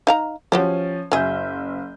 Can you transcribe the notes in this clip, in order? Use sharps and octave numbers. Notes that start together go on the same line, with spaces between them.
D#4 F5 A#5
F3 C#4 F#4 G4 C5
F#1 F#3 G#4 E5 G6